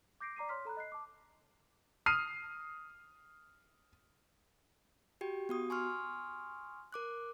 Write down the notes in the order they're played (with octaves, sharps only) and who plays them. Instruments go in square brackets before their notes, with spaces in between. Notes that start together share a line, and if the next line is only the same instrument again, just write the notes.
[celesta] D6 G6 A#6 C7 D7
D5 A#5 D6 C7 D#7
C#5 C6 F6 B6
A4 A#5 B5 F#6
D#5 F#6 C7
A5 D6
[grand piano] D#6 F6 C7 D#7
[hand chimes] F#4 G4 G5
B3 F#4 D#6
G#5 C6 C#6 D#6 F6
A#4 D6 F#6